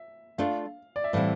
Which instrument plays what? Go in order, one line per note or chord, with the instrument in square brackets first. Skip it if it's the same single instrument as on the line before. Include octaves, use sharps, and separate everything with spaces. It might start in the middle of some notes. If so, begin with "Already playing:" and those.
Already playing: [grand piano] E5
[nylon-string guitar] A3 D4 F4 [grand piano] F5
[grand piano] D5
E5
[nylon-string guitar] A2 E3 G3 C4 [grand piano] F5